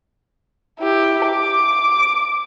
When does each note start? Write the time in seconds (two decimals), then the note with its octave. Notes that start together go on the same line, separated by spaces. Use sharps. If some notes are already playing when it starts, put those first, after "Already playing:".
0.80 E4 G4
1.27 D6